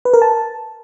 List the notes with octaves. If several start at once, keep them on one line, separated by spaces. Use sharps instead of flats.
B4
A#4
A5